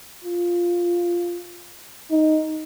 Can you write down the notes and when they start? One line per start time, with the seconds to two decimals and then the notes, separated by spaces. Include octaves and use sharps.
0.24 F4
2.11 D#4